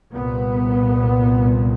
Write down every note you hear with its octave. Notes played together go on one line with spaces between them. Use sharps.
C2 A#2 B3